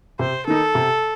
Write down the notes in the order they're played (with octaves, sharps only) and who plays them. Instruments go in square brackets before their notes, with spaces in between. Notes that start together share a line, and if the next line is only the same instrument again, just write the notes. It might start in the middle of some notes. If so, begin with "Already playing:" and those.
[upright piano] C3 [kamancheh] C5
[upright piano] D#3 A#3 D#4 [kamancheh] A4
[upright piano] C3